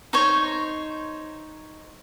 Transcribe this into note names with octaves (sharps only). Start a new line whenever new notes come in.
D#4 C5 C#5